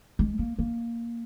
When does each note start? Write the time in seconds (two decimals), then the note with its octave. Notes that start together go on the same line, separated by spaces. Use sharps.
0.19 G#3
0.39 A#3
0.59 A#3